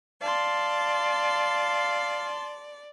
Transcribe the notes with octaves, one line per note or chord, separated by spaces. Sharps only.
D5 F5 A5 C6